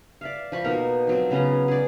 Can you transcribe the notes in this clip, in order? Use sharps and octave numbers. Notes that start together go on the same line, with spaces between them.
D5 E5 F5
F3 B5 C#6
B2 A#3 D#4 A#4
F3 F#3 C4
C#3 B3 C#4 A#5
G#4 D5